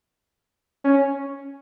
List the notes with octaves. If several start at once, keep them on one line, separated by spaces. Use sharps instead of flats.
C#4